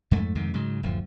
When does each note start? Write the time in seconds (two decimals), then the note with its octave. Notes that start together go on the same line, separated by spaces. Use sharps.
0.11 F2 G#2 A3
0.35 F2 G#2 C3 D#3
0.54 G#2 C#3 F#3
0.83 D1 F#2 F3